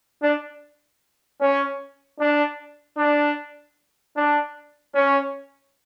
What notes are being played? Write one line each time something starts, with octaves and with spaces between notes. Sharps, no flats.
D4
C#4
D4
D4
D4
C#4